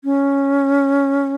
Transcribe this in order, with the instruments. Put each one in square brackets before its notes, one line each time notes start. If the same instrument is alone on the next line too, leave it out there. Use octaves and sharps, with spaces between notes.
[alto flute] C#4